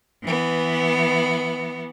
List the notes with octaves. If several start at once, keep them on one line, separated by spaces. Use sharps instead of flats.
E3 B3